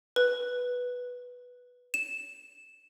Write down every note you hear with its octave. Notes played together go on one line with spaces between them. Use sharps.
B4
E7